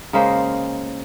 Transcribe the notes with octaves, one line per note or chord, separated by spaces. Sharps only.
C#3 G#3 A#3 C5